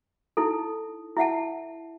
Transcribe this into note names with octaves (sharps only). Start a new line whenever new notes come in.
D#4 E4 A4
E4 E5 F#5 A5